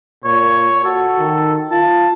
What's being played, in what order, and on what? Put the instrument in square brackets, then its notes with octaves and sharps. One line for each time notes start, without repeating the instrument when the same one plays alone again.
[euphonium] A#2 [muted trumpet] C#5
[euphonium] F#4 [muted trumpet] A4
[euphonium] D#3
[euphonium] F4 [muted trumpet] A5